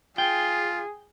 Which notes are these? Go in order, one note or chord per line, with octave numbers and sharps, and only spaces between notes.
F4 G#4 G5